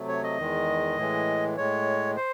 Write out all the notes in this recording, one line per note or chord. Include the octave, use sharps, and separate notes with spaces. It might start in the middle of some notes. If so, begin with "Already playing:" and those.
Already playing: C3 F#3 A3
C#5
D#5
E2 D#3 G#3
A2 E3 G#3
A2 G#3 C#5
C5